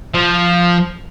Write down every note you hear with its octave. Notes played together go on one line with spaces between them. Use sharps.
F3